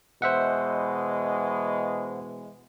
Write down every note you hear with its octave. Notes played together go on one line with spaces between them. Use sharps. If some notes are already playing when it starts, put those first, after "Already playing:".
B2 E3 G#3 C5 E5 F#5